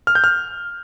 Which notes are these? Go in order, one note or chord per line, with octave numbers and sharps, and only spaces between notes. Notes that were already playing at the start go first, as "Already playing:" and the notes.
F6
G6
F6